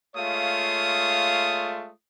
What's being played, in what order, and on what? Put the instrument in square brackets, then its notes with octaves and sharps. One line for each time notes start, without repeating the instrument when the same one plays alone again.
[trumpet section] G#3 A3 F4 C#5 F5 D#6